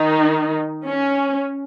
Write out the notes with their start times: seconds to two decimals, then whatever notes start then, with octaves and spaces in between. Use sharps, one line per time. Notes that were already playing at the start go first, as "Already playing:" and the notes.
Already playing: D#3 D#4
0.85 C#4